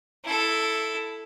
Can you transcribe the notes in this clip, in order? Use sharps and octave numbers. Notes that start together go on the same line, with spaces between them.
E4 A4